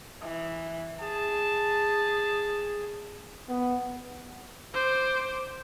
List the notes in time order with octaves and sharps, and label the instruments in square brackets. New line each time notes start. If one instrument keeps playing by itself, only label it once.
[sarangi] E3
[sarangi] G#4 [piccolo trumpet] A5
[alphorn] B3
[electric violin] C5 D6